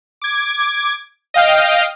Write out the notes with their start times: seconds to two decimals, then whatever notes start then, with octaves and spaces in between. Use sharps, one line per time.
0.22 D6 G#6
1.34 D#5 F5 G5 F6